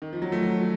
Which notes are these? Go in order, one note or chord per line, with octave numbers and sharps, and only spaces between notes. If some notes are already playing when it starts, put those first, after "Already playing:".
D#3
F3
F#3
A3
F#3